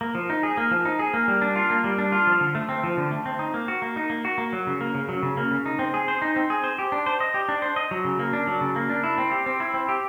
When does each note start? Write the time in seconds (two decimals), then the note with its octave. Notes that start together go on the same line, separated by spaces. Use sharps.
0.01 A#3
0.15 F3
0.30 D#4
0.43 G#4
0.57 A#3
0.71 F3
0.85 D#4
0.99 G#4
1.14 A#3
1.28 G3
1.42 D4
1.56 F4
1.70 A#3
1.84 G3
1.98 D4
2.12 F4
2.27 F3
2.41 D3
2.55 A3
2.69 C4
2.84 F3
2.97 D3
3.11 A3
3.26 C4
3.39 D#4
3.54 A#3
3.68 F#4
3.82 A#3
3.96 D#4
4.10 A#3
4.25 F#4
4.38 A#3
4.53 F#3
4.67 C#3
4.81 A#3
4.94 C#3
5.09 F#3
5.23 C#3
5.37 A#3
5.51 C#3
5.66 D#4
5.79 C4
5.94 G#4
6.08 C5
6.22 D#4
6.36 C4
6.50 G#4
6.64 C5
6.79 G4
6.92 D4
7.06 C5
7.20 D#5
7.34 G4
7.49 D4
7.62 C5
7.76 D#5
7.91 F#3
8.05 C#3
8.19 A#3
8.33 D4
8.47 F#3
8.61 C#3
8.76 A#3
8.90 D4
9.03 E4
9.18 C4
9.32 G4
9.46 C4
9.60 E4
9.74 C4
9.89 G4